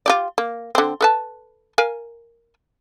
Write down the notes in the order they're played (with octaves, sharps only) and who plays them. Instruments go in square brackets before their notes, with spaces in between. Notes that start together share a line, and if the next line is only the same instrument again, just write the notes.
[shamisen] F4 G4 D5
A#3
D3 C4
A4 B4 A5
A#4 F5 G#5